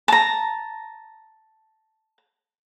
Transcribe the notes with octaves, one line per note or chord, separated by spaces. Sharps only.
A5 A#5